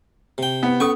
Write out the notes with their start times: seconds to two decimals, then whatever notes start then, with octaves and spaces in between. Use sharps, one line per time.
0.38 C3 G5
0.63 B3
0.80 C#4 A4 C#6 D#6